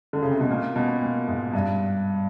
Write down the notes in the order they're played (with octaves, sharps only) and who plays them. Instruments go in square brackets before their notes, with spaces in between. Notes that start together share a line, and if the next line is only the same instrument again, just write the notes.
[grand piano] D3
C#3
C3
B2
A#2
B2
A#2
G#2
G2